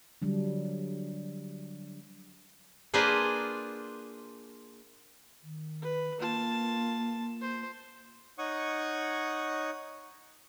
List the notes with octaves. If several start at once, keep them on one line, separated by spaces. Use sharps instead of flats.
D3 F#3 G3 D4
A#3 D4 F4 G#4 B4 C5
D#3
B4
A#3 F4 A5
C5
D#4 C#5 F#5 C#6 D#6